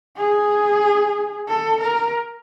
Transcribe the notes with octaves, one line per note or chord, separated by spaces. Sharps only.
G#4
A4
A#4